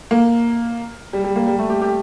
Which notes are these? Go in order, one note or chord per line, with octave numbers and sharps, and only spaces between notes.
A#3
G3
G3
A#3
G3
A3
G4
G4